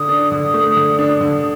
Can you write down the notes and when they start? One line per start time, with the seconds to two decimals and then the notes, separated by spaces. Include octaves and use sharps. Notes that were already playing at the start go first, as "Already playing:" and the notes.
Already playing: D3 D#6
0.09 D4
0.32 D3
0.54 A3
0.77 D3
0.99 D4
1.21 D3